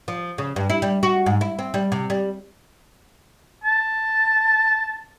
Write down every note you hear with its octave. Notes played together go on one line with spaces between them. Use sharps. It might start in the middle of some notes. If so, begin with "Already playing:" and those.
F3
C#3
G2
E4
G3
F#4
G#2
E4
C4
G3
C3
G3
A5